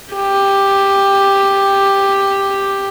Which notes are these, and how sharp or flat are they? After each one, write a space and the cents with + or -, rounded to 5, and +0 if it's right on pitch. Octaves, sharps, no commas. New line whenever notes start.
G4 +5